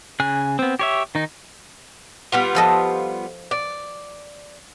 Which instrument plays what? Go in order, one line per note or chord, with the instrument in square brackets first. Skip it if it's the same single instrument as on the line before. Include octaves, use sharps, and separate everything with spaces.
[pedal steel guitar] C#3 G#5 F#6
B3 C4
G4 C#5 E5
D#3 D#4
[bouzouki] G3 B3 F4
[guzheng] F3 A4 D#5
[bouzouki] D5